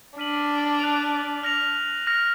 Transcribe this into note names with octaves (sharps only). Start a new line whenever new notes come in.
D4 F6 B6 D#7 F#7
F#6 D7 F7
F6 A#6 F7
F6 A#6 F7